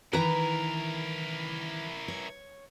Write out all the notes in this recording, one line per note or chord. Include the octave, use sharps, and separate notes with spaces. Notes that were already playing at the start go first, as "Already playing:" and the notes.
D#3 E3 E4 A#4 B4 A#5
C#5